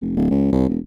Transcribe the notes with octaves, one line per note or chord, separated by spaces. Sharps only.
F1
D1
C#2
C2
E1